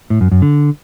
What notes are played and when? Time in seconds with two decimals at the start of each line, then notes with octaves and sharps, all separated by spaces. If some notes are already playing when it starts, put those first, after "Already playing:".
0.10 A2
0.21 F#2
0.32 F#2
0.42 D3